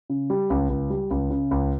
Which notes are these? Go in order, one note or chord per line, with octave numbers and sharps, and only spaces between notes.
C#3
G3
C#2
C#2
G3
C#2
C#3
C#2